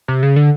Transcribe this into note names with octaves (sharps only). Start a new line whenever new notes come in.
C3
C#3
D3